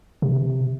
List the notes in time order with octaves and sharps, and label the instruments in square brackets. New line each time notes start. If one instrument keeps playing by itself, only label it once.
[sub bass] C3